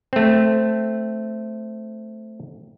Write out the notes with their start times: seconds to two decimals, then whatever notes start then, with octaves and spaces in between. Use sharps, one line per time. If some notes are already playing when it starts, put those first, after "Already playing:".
0.13 A3 C4